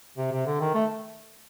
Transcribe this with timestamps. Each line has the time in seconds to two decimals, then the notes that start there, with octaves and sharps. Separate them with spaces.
0.18 C3
0.32 C3
0.46 D3
0.61 D#3
0.74 A3